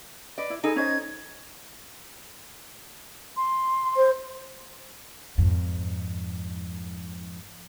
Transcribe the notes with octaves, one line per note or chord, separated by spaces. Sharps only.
B4 D5 D#5
E4
D#4 G#4 A4 G#5 B5
C#4 C5 D#5 G#6
C6
C5
F2 G#2